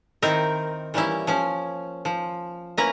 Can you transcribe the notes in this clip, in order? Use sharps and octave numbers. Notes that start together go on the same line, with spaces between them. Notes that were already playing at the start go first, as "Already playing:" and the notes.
D#3 C4 D#4 E4 A#4
E3 G3 A#3 C#4 E4
F3 C#4
F3
A#3 C#4 E4 B4 A#5